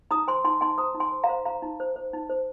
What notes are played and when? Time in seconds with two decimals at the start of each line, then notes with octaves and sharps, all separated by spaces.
0.11 D#4 A#5 D#6
0.28 C5 G#5 C6
0.44 D#4 G#5 C6
0.61 D#4 G#5 C6
0.78 C5 A#5 D#6
0.95 D#4
1.00 G#5 C6
1.12 C5
1.24 F5 A#5
1.29 C5
1.45 C5 F5 A#5
1.62 D#4
1.80 C5
1.96 C5
2.13 D#4
2.30 C5